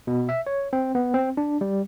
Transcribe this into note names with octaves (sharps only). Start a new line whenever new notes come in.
B2
E5
C#5
C4
B3
C4
D4
G3